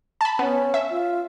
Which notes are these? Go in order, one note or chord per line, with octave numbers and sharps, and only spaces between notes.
A5 B5
B3 C#4
E5
F4